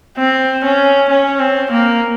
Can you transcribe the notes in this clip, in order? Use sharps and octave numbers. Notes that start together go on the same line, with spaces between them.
C4
C#4
C#4
C4
A#3